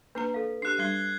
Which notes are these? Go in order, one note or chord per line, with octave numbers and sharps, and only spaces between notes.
A#3 D4 B4 A#5
A4 F5
D4 G4 F#6 C7
G3 D4 F#6 G#6 G7